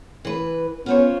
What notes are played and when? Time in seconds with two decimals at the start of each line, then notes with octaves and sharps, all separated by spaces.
0.25 E3 B4
0.86 B3 C#4 F4 C5 C#5